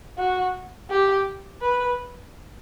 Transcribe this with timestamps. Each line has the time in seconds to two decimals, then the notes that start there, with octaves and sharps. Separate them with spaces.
0.18 F#4
0.90 G4
1.61 B4